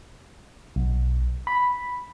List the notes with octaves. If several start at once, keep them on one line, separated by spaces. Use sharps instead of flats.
B1
B5